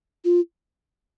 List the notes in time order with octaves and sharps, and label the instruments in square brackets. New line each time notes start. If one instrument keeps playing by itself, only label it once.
[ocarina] F4